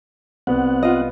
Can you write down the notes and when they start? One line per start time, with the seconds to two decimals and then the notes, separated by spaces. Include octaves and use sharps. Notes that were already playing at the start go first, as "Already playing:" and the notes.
0.47 C2 B3 C4 F#5
0.83 F4 D#5